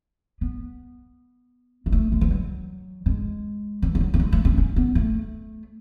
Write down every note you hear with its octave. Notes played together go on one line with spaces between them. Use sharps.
B3
G#3
A3
G#3
E3
F#3
G#3
E3
G#3
F#3
A3
G#3
A3
C#4
C#4
B3
A3